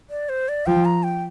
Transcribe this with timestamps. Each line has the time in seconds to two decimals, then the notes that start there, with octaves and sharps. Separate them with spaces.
0.10 D5
0.29 C5
0.49 D5
0.66 F3 G5
0.85 A#5
1.03 G5